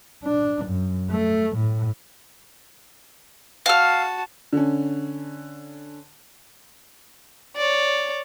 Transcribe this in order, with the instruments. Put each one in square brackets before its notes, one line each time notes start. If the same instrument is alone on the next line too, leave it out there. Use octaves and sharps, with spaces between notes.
[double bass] D4
F#2
A3
A2
[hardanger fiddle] F#4 A5 [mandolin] F5 F6
[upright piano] D3 C#4
[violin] C#5 D5